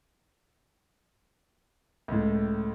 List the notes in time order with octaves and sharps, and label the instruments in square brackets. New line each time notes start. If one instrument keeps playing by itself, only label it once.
[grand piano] C#2 A2